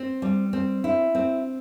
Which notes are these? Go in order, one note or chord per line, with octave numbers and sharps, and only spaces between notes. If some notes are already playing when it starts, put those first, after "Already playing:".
Already playing: C4
G3
C4
E4
C4